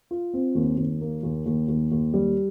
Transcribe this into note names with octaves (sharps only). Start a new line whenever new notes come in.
F4
C4
D#2
D#2
A#3
D#2
D#2
D#2
D#2
G3